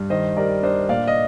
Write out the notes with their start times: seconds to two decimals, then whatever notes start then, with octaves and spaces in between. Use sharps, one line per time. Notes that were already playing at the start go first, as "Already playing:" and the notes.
Already playing: G2
0.10 D#3 C5 D#5
0.37 G3 A#4 D5
0.63 D4 C5 D#5
0.89 A#2 D5 F5
1.08 D#5